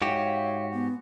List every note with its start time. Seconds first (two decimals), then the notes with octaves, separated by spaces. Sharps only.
0.02 G#2 F#4 G4 C#5 E5 F5
0.74 B3